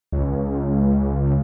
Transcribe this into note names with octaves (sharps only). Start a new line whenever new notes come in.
C#2